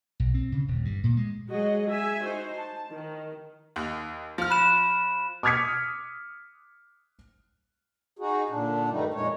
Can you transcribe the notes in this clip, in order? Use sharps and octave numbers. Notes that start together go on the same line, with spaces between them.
B1
C4
C#3
D#1
G2
A#2
G#3
F#3 G#3 F#4 G#4 D#5
G#4 E5 G#5
D#4 F#4 C5
A5
D#3
D#2
F3 F6
B5 F#6 E7
D6 D#6 F6 G#6 B6 C#7
D#4 F#4 G#4
A#2 D3 D4
G2 D#3 G3 A3 D#4
F2 A#2 G#3 C#5